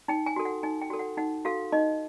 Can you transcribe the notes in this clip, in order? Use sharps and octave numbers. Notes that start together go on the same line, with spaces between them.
D#4 G5
G#5
F#4 A4
F#5
D#4 G#5
G5
F#4 A4
F#5
D#4 F#5
F#4 A4 F5
D#4 D#5